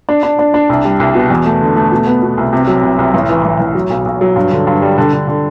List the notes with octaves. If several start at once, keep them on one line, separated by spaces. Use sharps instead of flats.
D4
D4
D4
D4
C2
G3
C2
B2
E2
A3
D3
A3
B2
B3
B2
C2
C3
F#3
C2
C2
A1
E3
A1
A1
F#3
B1
B1
F#3
G2
D3
G2
G3
D3
D3
D3